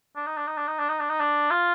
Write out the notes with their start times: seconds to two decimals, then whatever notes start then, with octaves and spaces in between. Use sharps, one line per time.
0.16 D4
0.27 D#4
0.37 D4
0.47 D#4
0.57 D4
0.68 D#4
0.78 D4
0.89 D#4
0.99 D4
1.10 D#4
1.20 D4
1.51 F4